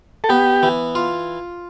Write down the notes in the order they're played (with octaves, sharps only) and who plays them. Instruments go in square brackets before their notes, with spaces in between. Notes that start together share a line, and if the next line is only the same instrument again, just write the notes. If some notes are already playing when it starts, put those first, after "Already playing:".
[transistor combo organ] A4
[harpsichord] B3 [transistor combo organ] G4
[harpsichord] E3
F4